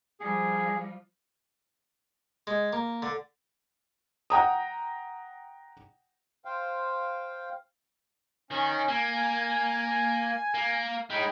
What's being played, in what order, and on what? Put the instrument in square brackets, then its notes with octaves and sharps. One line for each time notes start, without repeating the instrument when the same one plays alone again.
[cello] F3 G3 [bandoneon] G#4
[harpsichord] G#3
A#3
D3
[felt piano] F#5 G5 A#5 D#6
[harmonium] C5 F5 G5
[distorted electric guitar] D#3 [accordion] C#4
[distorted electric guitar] A#3 [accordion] G#5
[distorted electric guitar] A#3
[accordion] A2 G5 B5 [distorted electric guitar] G#3 D#4